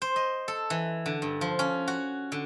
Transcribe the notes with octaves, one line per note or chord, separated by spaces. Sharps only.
C5
D#5
A4
E3
D3
G2
F3
C#4
F#4
D3